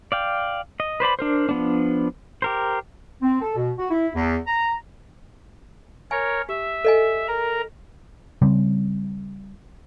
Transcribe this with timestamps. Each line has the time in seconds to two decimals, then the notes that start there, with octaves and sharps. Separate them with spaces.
0.12 D5 F5 G5
0.80 D#5
1.00 B4 C5 D5 B5
1.19 D4 A#4 C5
1.49 F3 B3 D4
2.42 G4 A#4 C5
3.22 C4
3.41 A4
3.56 B2
3.78 F#4
3.90 E4
4.15 E2
4.47 A#5
6.11 A#4 C#5 G#5
6.49 G4 E5
6.85 A4 D#5 G#5
7.28 A#4 A#5
8.42 C#3 G3 C4